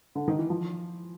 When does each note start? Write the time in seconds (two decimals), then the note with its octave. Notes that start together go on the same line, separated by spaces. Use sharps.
0.15 D3
0.28 D#3
0.39 E3
0.50 F3